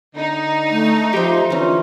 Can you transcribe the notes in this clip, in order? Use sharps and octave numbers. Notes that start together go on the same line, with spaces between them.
D3 D#4
A3
F3 G4 C5 E5
D3 E3 C#4 F4